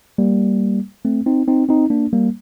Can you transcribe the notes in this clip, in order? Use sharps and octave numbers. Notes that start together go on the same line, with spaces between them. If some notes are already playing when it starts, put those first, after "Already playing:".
G3 A#3
A3 C4
C4 D#4
C4 D#4
C4 D#4
A#3 D4
G3 A#3